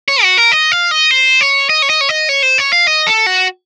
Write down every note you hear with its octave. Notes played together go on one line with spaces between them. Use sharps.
C#5
F#4
A#4
D#5
F5
D#5
C5
C#5
D#5
C#5
D#5
C#5
D#5
C#5
C5
C#5
F5
D#5
A4
F#4